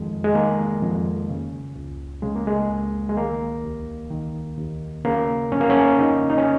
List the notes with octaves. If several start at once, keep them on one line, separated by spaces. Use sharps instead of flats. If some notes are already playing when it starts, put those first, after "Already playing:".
Already playing: F2 D#3 G#3
G#3
D#3 A#3
F2
C#3
C#2
C#3 G#3
A#3
G#3
C#2
G#3
D#3 A#3
D#2
D#3
D#2
C#3 A#3
F2 C#4
A#3
C#4
C#3 D#4
D#4
C#4